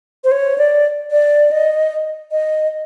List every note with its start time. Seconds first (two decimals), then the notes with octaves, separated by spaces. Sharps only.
0.24 C5
0.32 C#5
0.58 D5
1.11 D5
1.51 D#5
2.31 D#5